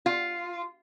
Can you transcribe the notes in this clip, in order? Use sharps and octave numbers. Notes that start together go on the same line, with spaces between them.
F4